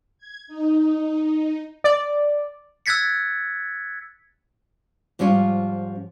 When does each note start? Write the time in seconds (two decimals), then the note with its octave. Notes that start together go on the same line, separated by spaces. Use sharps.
0.18 G#6
0.47 D#4
1.84 D5
2.86 E6 F#6 G#6 A6 B6 C#7
5.19 G#2 F3 G3 C#4 F4